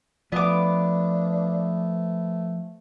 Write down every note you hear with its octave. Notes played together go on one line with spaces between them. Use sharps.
F3 A3 B3 D4 D6